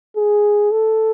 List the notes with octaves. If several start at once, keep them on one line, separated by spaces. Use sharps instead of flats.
G#4
A4